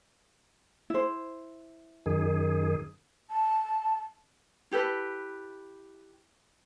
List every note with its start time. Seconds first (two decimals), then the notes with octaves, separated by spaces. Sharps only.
0.90 E4 C5
2.06 F#2 D#3 G#4
3.30 A5
4.71 E4 G4 A4 B4